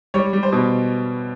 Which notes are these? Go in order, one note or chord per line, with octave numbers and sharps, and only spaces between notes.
G3 C#5
G3
C5
B2